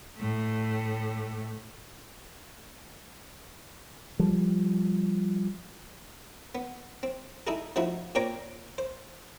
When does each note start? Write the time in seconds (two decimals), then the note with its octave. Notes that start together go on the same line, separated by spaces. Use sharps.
0.16 A2 A3
4.19 F3 G3
6.55 B3
7.03 C4
7.47 D#4 E4 G#4 A4
7.76 F3 A3 D#4 E4 F#4
8.15 A#2 C4 C#5 G5 A#5 D6
8.78 C5